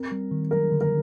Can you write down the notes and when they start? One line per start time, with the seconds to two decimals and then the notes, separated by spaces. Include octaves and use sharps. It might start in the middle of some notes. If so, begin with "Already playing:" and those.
Already playing: C4 A#4
0.12 G3
0.31 D#3
0.51 F#3 A#4
0.72 D3
0.81 A#4